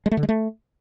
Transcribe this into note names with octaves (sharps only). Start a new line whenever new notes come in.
G#3
A3
D3
G#3
A3